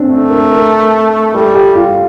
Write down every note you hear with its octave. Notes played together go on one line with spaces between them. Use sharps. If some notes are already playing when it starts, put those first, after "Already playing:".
Already playing: C4 D4
A3
A#4
A#4
G3 A4
G4
F4